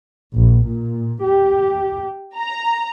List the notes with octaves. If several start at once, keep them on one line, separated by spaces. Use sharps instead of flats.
A#1
A#2
G4
A#5